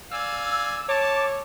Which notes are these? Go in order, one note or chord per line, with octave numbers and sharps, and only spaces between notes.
D5 F5 G#5 E6
C#5 A5 D6